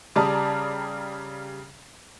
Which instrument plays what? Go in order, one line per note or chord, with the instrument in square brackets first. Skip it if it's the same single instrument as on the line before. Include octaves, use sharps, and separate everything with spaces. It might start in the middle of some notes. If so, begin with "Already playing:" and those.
[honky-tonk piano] C#3 G3 D5 A5 A#5 D#6